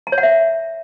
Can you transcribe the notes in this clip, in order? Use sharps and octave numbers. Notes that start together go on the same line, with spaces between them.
A#5
C#5
F#5
E5